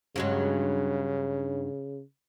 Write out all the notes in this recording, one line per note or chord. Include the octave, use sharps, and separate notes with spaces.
G2 C#3 F#3 G#3